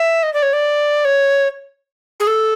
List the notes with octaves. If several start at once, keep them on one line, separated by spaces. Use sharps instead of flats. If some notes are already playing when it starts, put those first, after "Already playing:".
Already playing: E5
D#5
D5
C#5
D5
C#5
G#4
A4